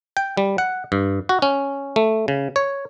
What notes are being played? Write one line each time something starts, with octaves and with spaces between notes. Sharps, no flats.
G5
G3
F#5
G2
F#4
C#4
A3
C#3
C#5